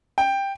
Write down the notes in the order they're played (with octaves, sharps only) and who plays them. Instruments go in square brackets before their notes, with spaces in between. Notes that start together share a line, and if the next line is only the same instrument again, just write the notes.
[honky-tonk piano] G5